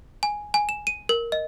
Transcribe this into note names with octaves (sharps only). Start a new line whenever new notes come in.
G#5
G#5
E7
D#7
A#4
D#5